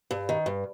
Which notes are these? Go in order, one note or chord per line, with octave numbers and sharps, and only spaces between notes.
G2
D#3
G2